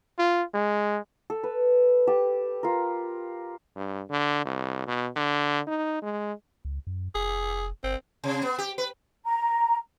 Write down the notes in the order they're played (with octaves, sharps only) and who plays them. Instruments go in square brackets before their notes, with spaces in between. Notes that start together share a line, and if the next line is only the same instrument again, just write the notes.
[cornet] F4
G#3
[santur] A4
B4
G4 A5
F4 A#4
[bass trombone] G2
D3
C2
B2
D3
D#4
G#3
[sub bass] C#2
F#2
[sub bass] F1 [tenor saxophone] G#4
[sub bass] G1 [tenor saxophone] C4
[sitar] C3
B3
G4
B4
[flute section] A#5